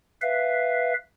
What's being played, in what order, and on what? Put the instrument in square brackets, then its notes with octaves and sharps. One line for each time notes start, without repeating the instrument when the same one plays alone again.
[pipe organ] B4 E5 F5